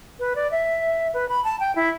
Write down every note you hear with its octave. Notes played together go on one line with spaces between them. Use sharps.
B4
D5
E5
B4
B5
A5
G5
E4